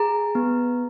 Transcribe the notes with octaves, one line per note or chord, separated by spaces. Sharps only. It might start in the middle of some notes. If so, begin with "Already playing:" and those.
Already playing: G#4 A#5
B3